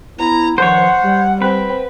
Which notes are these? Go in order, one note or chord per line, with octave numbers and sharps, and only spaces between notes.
B3 E4 A#5
G2 D#3 F3 C5 C#5 F#5
G3
C4 B4